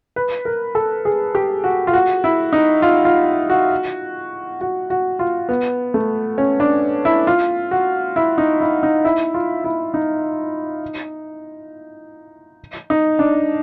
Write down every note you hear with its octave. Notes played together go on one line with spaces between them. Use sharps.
B4
A#4
A4
G#4
G4
F#4
F4
F#4
E4
D#4
F4
F4
F#4
F#4
F#4
F4
B3
A3
C#4
D4
E4
F4
F#4
E4
D#4
E4
D#4
E4
F4
E4
D#4
D#4
D4